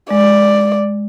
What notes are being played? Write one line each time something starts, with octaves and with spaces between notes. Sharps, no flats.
G#3 D5